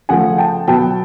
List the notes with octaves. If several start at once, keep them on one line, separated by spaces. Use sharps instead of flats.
C#3 F3 A3 F#5 G#5
G5 A5
B2 F#3 B3 G5 A5